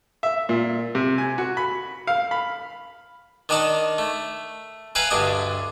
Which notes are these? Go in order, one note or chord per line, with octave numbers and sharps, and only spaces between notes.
E5
A#2
C3
G#5
F#4
B5
F5
B5
D#3 D4 D#4 D#5 A5
A3
B4 E5 F5 G5 G#5 A#5
D2 G2 D4 D#5